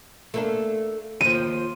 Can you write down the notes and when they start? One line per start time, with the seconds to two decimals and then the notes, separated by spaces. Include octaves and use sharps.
0.34 A3 A#3 D4
1.21 D#2 F3 D#7